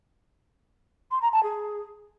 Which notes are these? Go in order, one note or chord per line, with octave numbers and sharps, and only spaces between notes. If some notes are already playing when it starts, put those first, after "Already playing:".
C6
A#5
A5
G#4